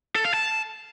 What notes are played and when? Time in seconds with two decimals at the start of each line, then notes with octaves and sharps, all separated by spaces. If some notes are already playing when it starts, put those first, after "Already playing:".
0.15 A4
0.25 F5
0.34 A5